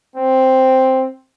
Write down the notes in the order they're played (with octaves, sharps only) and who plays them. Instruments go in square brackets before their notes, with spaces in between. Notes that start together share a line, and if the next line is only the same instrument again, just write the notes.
[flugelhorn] C4